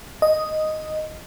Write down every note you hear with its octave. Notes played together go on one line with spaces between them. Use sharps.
D#5